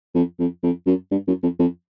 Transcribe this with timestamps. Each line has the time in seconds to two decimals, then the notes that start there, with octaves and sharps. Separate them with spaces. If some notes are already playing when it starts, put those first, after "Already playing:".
0.15 F2
0.39 F2
0.63 F2
0.86 F#2
1.11 G2
1.27 F#2
1.43 F2
1.59 F2